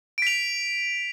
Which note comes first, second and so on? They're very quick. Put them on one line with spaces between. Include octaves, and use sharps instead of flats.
D7 B6 F7